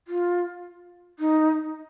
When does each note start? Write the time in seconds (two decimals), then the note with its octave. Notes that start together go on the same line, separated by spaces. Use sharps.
0.08 F4
1.19 D#4